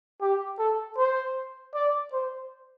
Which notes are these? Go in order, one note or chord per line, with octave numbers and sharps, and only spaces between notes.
G4
A4
C5
D5
C5